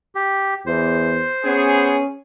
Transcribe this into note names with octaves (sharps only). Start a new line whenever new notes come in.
G4
E2 C5
B3 C#4 G#4